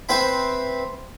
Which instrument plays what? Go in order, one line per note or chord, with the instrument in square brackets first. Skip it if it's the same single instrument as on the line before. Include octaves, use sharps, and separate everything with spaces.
[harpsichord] C4 B4 C5 E5 G5 B5